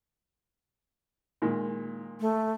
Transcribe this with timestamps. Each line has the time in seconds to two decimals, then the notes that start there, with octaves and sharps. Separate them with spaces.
1.42 A#2 D#3 G#3
2.21 A3